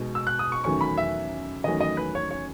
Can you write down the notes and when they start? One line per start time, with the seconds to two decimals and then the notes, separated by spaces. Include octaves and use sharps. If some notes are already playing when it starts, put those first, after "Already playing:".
Already playing: B2 G#3 D#4
0.15 E6
0.27 F#6
0.39 D#6
0.52 C#6
0.64 E2 D#3 F#3 A3 C#4 C#6
0.81 B5
0.98 E5
1.64 E2 D#3 F#3 A3 C#4 D#5
1.81 D#5
1.97 B4
2.15 C#5
2.31 C#5